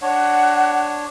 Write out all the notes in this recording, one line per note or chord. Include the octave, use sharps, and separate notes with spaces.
D4 C#5 F#5